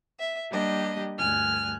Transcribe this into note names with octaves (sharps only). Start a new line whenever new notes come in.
E5
G3 A#3 D4 G4 D#5
D2 G2 G#5 F6 F#6